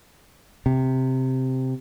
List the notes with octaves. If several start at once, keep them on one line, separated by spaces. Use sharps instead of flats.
C3